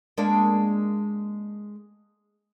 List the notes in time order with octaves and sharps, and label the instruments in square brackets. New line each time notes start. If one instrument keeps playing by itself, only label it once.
[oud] G#3 A#3 D4